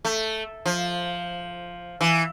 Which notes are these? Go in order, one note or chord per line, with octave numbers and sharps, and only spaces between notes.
A3
F3
E3